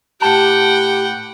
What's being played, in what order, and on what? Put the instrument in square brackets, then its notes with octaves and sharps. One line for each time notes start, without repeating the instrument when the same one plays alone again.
[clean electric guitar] A2 A5 [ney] G4 [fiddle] F#5 G5